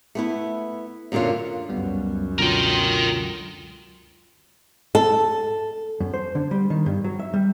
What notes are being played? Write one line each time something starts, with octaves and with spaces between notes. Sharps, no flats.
A3 B3 E4
F#2 A#2 D3 F#3 F4
C#2 F#2 G3 B3
B2 D3 F#3 F4 A#4 G5
A4
F#2
C5
D3
G3
D#3
G2
F#3
E5
G3